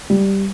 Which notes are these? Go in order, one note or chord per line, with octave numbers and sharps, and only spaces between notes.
G3